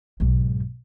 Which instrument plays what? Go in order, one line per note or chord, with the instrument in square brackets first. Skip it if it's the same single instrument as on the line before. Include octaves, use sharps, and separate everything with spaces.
[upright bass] B1 G#2